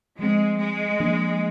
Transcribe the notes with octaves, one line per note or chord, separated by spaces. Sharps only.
F3 G#3 C4
G#3
F3 A#3 D4